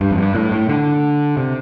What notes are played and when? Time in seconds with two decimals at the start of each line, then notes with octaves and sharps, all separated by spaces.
0.01 G2
0.11 F2
0.18 G2
0.35 A2
0.52 A2
0.69 D3
1.37 C3